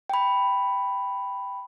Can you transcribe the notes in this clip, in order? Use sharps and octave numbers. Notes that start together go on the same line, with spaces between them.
G5 B5